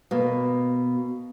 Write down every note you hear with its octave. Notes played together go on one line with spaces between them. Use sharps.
B2 A#3